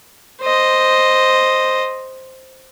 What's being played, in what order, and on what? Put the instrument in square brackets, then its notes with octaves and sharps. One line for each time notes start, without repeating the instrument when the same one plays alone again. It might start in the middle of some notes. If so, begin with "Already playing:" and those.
[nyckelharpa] C5 D#5